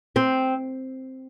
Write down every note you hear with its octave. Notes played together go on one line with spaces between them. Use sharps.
C4